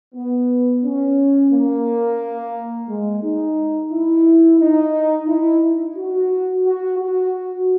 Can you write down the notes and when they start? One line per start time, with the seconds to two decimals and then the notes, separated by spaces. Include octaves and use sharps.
0.15 B3
0.84 C#4
1.52 A#3
2.89 G#3
3.23 D#4
3.92 E4
4.60 D#4
5.28 E4
5.97 F#4
6.65 F#4
6.99 F#4